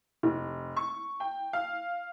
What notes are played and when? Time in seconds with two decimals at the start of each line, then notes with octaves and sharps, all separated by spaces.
0.23 F1
0.76 C#6
1.20 G5
1.53 F5